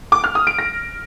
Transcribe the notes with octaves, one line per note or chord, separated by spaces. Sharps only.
D6
F6
D#6
D7
A#6